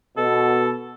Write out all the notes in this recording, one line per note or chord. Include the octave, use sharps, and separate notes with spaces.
B2 A4